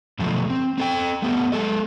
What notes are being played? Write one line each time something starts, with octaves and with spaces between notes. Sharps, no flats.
F#2 B2 D3 F3 A3
C4
C4 A4 G5
A3 B3 G4
G#3 G#4 A4 D#5